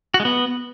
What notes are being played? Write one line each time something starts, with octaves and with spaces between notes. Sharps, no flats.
F#4
G#3
B3